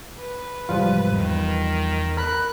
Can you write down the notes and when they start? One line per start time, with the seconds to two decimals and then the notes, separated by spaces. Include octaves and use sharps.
0.18 B4
0.69 G#2 C3 E3 F3 G3 F4
1.14 E2 D#3
2.17 A#4 B5 F#6